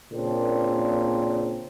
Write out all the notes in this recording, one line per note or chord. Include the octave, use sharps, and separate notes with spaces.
A#2 C#3 A#3 C4 D4